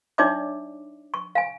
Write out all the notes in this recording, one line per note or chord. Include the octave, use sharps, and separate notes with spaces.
D4 D#4 C#5 D5 E5 D6
C#6
F5 G#5